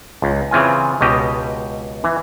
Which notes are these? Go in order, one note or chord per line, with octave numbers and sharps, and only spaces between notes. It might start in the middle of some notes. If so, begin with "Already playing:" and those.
C#2
C#3 E3 C4 F4 G#5
C#2 B2 G4 D#5
E3